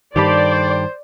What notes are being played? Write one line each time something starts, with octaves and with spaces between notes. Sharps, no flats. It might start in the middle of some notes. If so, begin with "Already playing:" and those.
G2 D#3 G4 A4 C5 D5 B5